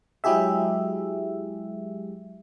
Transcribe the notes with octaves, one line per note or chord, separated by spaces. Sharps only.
F#3 G#3 E4 G4 G#4 E5